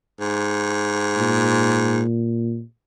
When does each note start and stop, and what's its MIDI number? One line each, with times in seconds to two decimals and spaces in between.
0.20 2.02 44
1.17 2.62 46